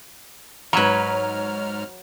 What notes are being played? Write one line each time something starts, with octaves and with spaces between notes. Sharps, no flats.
G#2 F#3 B4 C#5 A#5 F6 G#6